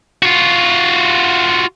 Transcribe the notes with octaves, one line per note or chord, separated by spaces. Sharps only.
F4 F#4